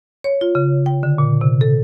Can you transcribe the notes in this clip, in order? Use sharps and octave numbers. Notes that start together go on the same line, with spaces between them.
C#5
F4
C#3
G5
D3
A#2
C3
A4